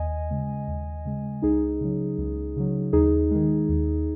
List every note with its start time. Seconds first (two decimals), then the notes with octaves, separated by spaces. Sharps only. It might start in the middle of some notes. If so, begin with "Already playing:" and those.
Already playing: D#2 D#5 G#5
0.31 C#3 G#3
0.68 D#2
1.05 C#3 G#3
1.42 C#2 D#4 G#4
1.80 C#3 F#3
2.18 C#2
2.56 C#3 F#3
2.93 D#2 D#4 G#4
3.31 D#3 G#3
3.69 D#2